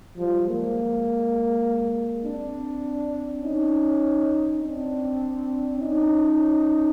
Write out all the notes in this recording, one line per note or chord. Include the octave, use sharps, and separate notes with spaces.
F3 G3
G#3 A#3
C4 D4
C#4 D#4
C4 D4
C#4 D#4